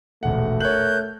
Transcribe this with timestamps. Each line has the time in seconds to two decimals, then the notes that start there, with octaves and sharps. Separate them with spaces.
0.23 E1 A#1 A3 F#5
0.60 A#4 C#5 F#6 G6 F#7